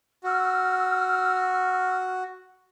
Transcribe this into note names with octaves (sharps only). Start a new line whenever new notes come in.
F#4 E6 F6